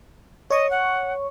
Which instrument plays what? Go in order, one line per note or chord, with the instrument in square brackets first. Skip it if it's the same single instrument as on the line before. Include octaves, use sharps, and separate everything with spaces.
[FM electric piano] C#5 C#6 [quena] D#5
[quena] F#5